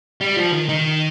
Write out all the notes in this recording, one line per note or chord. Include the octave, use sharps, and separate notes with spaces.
G3
F3
D#3
D#3